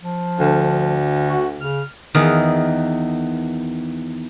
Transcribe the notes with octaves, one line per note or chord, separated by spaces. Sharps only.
F3
D2 D3
F#4
C#3 F6
E2 D#3